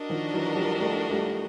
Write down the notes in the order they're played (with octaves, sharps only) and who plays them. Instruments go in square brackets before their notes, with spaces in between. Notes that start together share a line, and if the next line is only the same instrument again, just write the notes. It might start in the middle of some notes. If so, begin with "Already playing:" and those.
Already playing: [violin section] D4 F#4 A#4 D#5
[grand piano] D#3 F3
E3 F#3
F3 G3
G3 A3
G3 A3